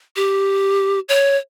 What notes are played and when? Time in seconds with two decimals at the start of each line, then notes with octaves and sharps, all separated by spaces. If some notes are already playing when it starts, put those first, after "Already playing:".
0.16 G4
1.09 C#5